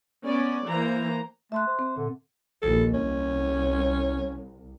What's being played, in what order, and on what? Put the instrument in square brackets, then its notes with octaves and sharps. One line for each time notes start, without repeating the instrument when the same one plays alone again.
[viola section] B3 C#4 D5
E3 A#3 C5 A#5
[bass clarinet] A3 [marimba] E5 C6 F#6
[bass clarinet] C5
[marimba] C4
[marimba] A#2 [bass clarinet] D3
[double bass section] A#1 D#2 [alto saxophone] A4
[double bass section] C2 [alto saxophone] C#4